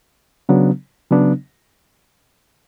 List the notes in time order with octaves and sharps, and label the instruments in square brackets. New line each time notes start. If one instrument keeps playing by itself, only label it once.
[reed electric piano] C#3 F#3 B3 D4
C#3 F#3 B3 D4